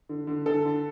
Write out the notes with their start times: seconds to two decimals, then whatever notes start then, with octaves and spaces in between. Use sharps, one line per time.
0.09 D3
0.27 D3
0.46 D3 A4
0.65 D3